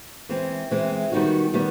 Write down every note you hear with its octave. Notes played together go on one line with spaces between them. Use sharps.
E3 G#3 C4
E3 G#3 C4
D#3 G3 B3 D#4 F#4
D#3 G3 B3